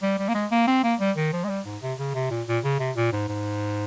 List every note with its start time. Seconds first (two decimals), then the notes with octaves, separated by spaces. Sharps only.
0.02 G3
0.19 G3
0.28 A#3
0.34 G#3
0.51 A#3
0.67 C4
0.83 A#3
1.00 G3
1.17 D#3
1.33 F3
1.44 G#3
1.49 G3
1.65 G#2
1.82 C3
1.98 C#3
2.15 C3
2.31 A#2
2.47 A#2
2.64 C#3
2.79 C3
2.96 A#2
3.12 G#2
3.28 G#2